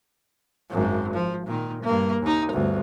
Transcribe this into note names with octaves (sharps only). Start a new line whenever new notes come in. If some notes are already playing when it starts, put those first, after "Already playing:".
G#1 F#2
F3
A#2 D#3
G2 A#3
D#2 D#4
G1 D2